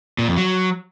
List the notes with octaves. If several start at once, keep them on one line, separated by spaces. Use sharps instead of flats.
A#2
F2
F#3